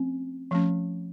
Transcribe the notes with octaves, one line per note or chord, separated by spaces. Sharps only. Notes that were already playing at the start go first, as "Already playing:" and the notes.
Already playing: F3 A3 C4 C#4
F3 A3 C#4